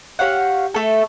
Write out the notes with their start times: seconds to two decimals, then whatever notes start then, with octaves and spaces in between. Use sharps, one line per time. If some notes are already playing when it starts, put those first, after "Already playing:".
0.19 G4 C#5 F5 F#5
0.74 A3 A4